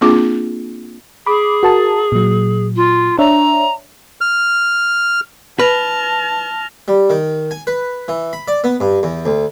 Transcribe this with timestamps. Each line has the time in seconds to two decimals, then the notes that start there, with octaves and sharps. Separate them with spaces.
0.01 A#3 C4 D4 F4 G#4 D6
1.26 G#4 B5 D6
1.63 F#4 A#4 A5
2.12 A#2 F#3
2.76 F4
3.19 D4 C#5 E5 A#5
4.21 F6
5.59 B4 A5 F6 A#6 F7
6.88 G3
7.10 D#3
7.51 G#5
7.67 B4
8.08 E3
8.33 B5
8.48 D5
8.64 B3
8.80 G2
9.03 E2
9.26 D2